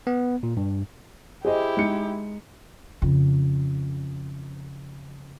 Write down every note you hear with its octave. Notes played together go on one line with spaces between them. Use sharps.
B3
A#2
G2
E4 G4 G#4 C5 D#5
G#3 D#4 C#7
F2 C#3